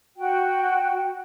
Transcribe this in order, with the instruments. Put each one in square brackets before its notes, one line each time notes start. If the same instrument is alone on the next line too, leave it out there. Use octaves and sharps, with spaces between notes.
[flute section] F#4 G5